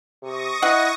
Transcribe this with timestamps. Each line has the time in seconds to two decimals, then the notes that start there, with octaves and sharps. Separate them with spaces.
0.23 C3 C#6 D#6 A#6
0.63 E4 D#5 F#5